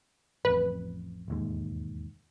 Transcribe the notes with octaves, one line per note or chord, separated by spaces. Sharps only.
A1 F2 B4
E1 D#2 G#2